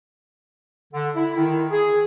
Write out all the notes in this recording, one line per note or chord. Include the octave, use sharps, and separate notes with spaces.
D3
E4
D#3
G#4